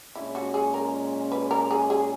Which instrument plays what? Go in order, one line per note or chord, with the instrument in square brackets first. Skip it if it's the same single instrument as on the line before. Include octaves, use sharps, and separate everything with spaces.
[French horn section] A#2 G#3 C#4 [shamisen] E4
[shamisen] F#4
G#4
A#4
B4
A#4
G#4
G#4